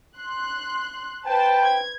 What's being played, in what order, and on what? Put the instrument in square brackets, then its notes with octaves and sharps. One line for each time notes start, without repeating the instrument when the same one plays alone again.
[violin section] C6 F#6
[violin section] B4 C5 A5 [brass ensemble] G5
[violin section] G#6